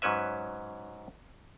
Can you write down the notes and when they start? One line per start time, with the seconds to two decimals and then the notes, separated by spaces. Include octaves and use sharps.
0.02 G#2 F#3 C#4 B4 E5